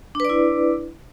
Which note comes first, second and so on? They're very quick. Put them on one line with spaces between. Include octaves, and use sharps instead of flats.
D4 B4 D5 E4